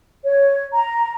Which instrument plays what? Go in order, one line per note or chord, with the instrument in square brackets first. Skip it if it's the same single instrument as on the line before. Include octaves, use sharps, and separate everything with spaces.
[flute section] C#5
A#5